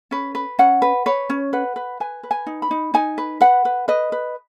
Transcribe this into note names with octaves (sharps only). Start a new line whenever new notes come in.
C#4 B4
B4
C#4 F#5
B4
B4 C#5
C#4
B4 F#5
B4
B4 G#5
B4
G#5
D#4
B5
D#4
D#4 G#5
B4
B4 F#5
B4
B4 D#5
B4